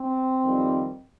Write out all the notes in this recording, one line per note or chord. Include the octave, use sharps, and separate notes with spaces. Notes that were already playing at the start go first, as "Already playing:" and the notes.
Already playing: C4
F2 D#3 G3